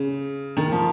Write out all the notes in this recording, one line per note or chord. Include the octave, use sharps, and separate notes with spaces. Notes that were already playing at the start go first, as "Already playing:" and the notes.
Already playing: C#3
D#3
F3